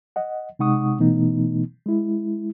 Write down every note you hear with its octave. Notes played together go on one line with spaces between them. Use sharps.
D#5 F#5
C3 G#3 D#4 F#5 C#6 D#6
B2 E3 A3 B3 D#4
G#3 E4